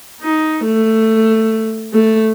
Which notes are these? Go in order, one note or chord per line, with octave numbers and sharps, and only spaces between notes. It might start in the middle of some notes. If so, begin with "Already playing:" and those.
D#4
A3
A3